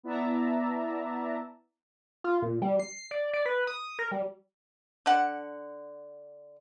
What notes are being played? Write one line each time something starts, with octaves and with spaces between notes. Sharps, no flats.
B3 E4 D5 E5 A5 A#5
F4
A#2
G3
C7
D5
D5
B4
D#6
A#4
G3
D3 F#5